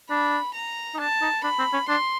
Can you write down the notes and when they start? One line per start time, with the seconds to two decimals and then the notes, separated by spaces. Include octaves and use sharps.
0.10 D4 B5
0.54 A#5
0.94 D#4
0.99 D4 A5
1.21 D#4
1.43 D4 B5
1.59 C4
1.73 C#4
1.88 D4 C6